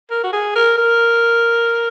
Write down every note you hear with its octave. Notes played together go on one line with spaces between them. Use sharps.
A#4
F#4
G#4
A#4
A#4